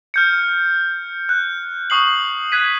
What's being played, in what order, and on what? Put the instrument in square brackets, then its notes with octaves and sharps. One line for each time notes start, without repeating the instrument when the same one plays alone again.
[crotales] F6 G6 C#7
F#6
C#6 D#6 C7 F#7
F#6 G#6 B6 D#7